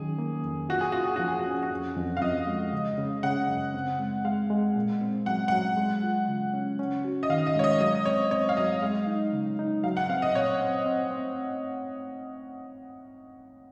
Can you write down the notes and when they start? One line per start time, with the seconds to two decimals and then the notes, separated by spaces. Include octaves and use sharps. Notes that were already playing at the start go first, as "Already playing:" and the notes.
Already playing: D#3 F#3 C#4 G#4
0.18 A#3
0.44 F2
0.69 F4 F#4
0.81 G#4
0.92 F4 F#4
1.04 G#4
1.16 F3 F#4
1.28 G#4
1.39 F#4
1.46 C#4 G#4
1.63 F#4
1.71 F2
1.96 F2
2.17 F5
2.22 F2 D#5
2.47 G#3
2.73 C#3
2.98 C#3
3.23 C#3 F#5
3.48 F#2
3.74 C4
4.00 G#3
4.25 G#3 F5
4.50 G#3
4.76 A#2
5.02 C4
5.26 F#3 F#5
5.48 F#3 F#5
5.77 G#3
6.03 F4
6.28 C#3
6.54 C#4
6.79 C#4
7.04 F#4
7.23 D#5
7.29 D#3 F5
7.47 D#5
7.56 G#3 C#5
7.64 D#5
7.81 F#3 D#5
8.06 C4 C#5
8.31 C4 C#5
8.49 F5
8.57 F#3 D#5
8.82 G#3 F5
9.07 D#4
9.33 C#3
9.59 D#4
9.84 F#3 F5
9.97 F#5
10.09 C4 F5
10.22 D#5
10.34 A#2 C#5
10.61 C4
10.85 C4
11.11 C4